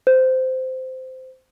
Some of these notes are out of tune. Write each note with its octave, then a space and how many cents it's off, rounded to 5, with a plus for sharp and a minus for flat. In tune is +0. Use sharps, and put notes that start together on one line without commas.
C5 -15